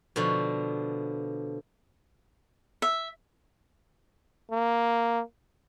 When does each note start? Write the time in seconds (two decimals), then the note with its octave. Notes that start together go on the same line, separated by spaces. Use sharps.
0.16 B2 D3 F3
2.82 E5
4.51 A#3